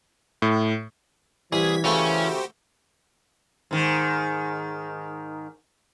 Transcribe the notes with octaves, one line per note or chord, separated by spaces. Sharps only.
A2
C2 E3 G#4 G#6 B6
C#3 A3 C#4 F#4 G4 C5 C#6
G#2 D#3